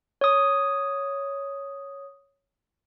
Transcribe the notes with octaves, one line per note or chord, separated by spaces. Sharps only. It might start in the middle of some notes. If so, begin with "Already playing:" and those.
C#5 D#6